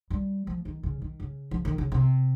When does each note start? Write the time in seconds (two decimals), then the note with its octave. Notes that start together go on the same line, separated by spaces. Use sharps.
0.10 G3
0.47 F3
0.65 D#3
0.83 C#3
1.02 D#3
1.20 C#3
1.51 F3
1.65 D#3
1.78 C#3
1.92 C3